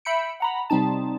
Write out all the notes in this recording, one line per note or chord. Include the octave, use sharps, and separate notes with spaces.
E5 B5 G6 C#7 D7
F#5 A#5 B5
C3 G3 C4 D#4 A5